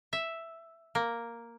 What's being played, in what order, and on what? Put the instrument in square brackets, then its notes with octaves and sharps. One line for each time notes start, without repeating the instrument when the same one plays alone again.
[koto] E5
A#3